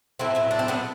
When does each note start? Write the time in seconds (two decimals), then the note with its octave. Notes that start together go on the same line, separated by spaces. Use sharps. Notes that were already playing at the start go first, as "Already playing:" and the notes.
0.19 A2 F#3 A3 C4 E4
0.35 C4 E4
0.51 D4
0.59 C4
0.68 B3 D4